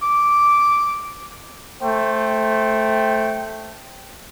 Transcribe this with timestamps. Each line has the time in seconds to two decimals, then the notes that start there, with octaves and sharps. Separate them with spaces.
0.03 D6
1.82 A3 C5 G5